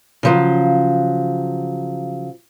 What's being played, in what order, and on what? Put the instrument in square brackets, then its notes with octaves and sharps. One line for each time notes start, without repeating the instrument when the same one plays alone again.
[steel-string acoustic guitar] C#3 F3 F#3